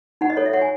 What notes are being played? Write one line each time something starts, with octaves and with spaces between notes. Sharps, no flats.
D#4 F#5
D#5
A4 C#5
E5
C#5 F#5
G#5